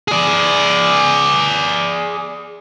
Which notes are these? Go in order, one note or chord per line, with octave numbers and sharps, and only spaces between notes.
G#4 D5